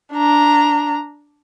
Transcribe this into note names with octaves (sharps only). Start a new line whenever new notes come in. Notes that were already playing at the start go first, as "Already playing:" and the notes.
D4 A#5